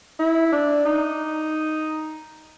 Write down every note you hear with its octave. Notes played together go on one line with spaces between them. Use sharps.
E4
D4
D#4